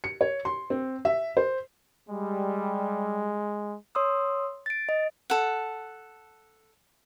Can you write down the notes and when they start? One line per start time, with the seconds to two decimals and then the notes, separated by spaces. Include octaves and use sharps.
0.04 C#7
0.21 C#5
0.45 C6
0.70 C4
1.05 E5
1.37 C5
2.09 G3 G#3
3.95 C#5 C6 D#6 E6
4.66 A6 D7
4.89 D#5
5.30 A4 F#5